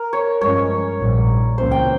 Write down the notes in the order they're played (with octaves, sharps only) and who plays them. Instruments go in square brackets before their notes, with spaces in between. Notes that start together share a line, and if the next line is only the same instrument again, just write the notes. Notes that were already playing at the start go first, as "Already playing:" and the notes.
Already playing: [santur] A#4
C#5
[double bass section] G2 F3 G#3 C#4 [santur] C#5
[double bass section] A#1 G#2 G3
[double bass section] C#2 C3 E3 A#3 C#4 [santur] C5
[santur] G5